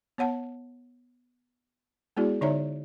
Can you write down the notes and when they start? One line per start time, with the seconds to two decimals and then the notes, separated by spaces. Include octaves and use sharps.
0.18 B3 C#5 F#5 A5
2.17 G#3 B3 E4 F#4 G#4 D5
2.41 D3 D#4 C#5 D5 E5 A#5